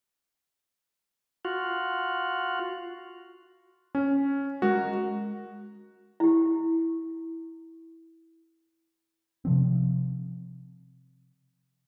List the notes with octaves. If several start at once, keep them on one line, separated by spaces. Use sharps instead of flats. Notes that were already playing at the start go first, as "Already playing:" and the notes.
F4 F#4
C#4
G#3 F#4 A#4
E4 G4
C3 F3 C4